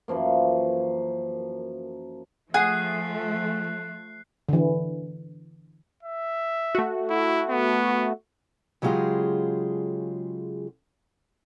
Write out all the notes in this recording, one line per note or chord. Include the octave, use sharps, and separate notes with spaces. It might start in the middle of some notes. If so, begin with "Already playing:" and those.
F#2 E3 F3 A#3
F3 A3 G#4 F#5 F#6 C7
D3 E3
E5
A3 F#4
E4
B3
C#3 F#3 G#3 F4 G4 G#4